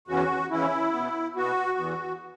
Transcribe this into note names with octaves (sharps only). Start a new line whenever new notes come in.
E2 C#3 E3 C#4 F#4
E2 C#3 E3 C#4 E4
B2 B3
B2 B3 F#4
E2 E3 B3